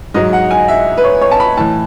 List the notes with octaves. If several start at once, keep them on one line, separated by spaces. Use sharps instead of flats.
G#2 F#3 D#5
F#5
G#5
E5
B4
C#5
C#5
A5
B5
A2 E3 A5